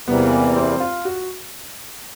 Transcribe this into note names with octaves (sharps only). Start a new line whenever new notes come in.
E2 C3 E3 G3 A#3 B3
C4
F4
F#4